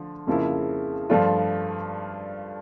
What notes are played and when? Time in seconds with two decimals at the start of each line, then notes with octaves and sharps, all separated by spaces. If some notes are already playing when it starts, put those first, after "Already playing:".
Already playing: D3 F3 A3
0.27 F2 C#3 F3 A#3 E4
1.10 G2 F3 A3 D4 F4